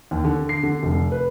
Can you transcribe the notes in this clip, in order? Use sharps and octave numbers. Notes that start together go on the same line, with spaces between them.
D#2
D3
C7
D3
F1
B4